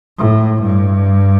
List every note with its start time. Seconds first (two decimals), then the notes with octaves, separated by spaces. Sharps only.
0.18 A2
0.63 G2